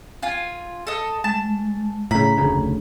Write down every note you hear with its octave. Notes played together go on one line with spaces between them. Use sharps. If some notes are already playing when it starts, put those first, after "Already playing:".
F4 G#5
A4 D#5
G#3 A5
A2 C#3 A#5 B5
F1 D2 C#3